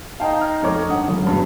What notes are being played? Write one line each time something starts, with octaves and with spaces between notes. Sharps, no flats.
D#4 F5 G5 A5
F6
F1 A3 C4 C#5 D6
G2 F#5 D#6
G1 C#2 F#2
E1 G2